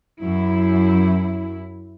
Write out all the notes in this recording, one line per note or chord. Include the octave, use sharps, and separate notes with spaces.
F#2 E4